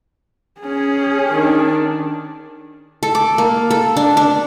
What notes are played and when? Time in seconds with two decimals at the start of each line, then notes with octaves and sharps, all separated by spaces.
0.61 C#4 G#4
1.30 D#3 D4
3.03 A4
3.15 D6
3.38 A#3
3.71 A4
3.97 D4
4.17 D4